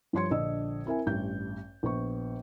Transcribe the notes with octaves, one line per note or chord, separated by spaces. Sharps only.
G2 F3 C#5 C6 G#6 C#7
A#1 D3 D4 D#5 E6
C4 E4 A#4 E5 G#5
A1 G2 G6
A#1 B3 C#6